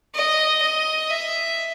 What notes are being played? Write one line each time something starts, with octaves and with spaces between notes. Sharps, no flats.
D#5
D#5
E5